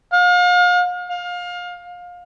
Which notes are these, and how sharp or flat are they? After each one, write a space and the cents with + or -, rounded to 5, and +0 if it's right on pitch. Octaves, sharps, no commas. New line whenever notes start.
F5 +40
F5 +25